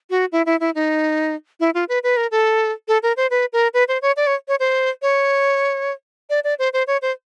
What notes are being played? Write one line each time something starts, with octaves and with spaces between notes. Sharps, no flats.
F#4
E4
E4
E4
D#4
E4
F4
B4
B4
A#4
A4
A4
A#4
C5
B4
A#4
B4
C5
C#5
D5
C#5
C#5
C5
C#5
D5
D5
C5
C5
C#5
C5